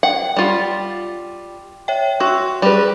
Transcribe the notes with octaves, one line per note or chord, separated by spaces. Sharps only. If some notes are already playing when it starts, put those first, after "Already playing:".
F#5 G5
G3 F4
C#5 E5 G5
F#4 C6 E6
G3 G#4 B4 B5